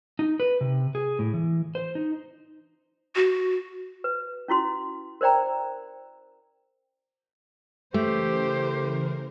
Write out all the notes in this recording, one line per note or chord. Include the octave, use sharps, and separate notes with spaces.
D#4
B4
C3
G#4
A2
E3
C5
D#4
F#4
B4
C#4 E4 F#4 C6
A#4 C5 D5 G5 A#5
C#3 E3 A3 G4 A#4 C5